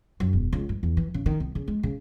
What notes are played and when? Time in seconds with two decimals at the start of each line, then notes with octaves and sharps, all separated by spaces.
0.20 F#2
0.33 E1
0.53 C#2
0.69 G2
0.83 E2
0.97 E3
1.14 C#3
1.26 D#3
1.40 C2
1.55 C#3
1.68 G#3
1.83 C#3